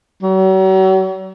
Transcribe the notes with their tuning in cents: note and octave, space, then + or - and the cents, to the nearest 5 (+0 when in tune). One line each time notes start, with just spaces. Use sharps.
F#3 +40